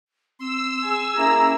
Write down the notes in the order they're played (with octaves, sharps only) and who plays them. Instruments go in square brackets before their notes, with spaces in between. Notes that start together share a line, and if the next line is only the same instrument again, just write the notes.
[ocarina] C4 [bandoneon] C6 [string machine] E6
[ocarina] G#4 [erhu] G#5
[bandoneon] A#3 E4 G#4 [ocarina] C#4 [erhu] A#5